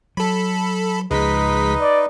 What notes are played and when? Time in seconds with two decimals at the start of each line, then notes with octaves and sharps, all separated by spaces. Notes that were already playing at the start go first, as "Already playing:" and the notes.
0.17 F#3 A4 B5
1.11 C#2 F3 G#3 D#4 B4 D#5 B6
1.79 D5